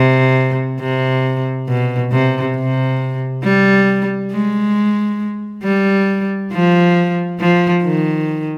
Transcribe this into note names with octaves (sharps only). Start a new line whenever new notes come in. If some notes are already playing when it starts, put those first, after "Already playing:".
Already playing: C3
C3
B2
C3
C3
G3
G#3
G3
F3
F3
D#3